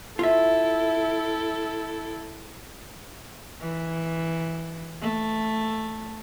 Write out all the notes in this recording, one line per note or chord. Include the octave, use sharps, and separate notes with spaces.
E4 F4 A4 E5
E3
A3